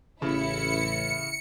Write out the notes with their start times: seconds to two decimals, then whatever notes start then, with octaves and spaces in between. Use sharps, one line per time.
0.22 A1 C#3 E4 C#7